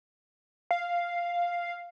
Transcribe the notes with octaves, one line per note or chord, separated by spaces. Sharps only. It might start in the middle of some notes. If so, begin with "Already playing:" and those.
F5